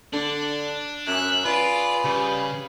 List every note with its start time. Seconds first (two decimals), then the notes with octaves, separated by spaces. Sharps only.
0.13 D3 D4
1.07 F#2 E5 F#6
1.45 F4 G#4 B4 D5
2.04 C#3 G3